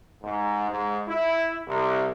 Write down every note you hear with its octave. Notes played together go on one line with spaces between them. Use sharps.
G#2
G#2
E4
C2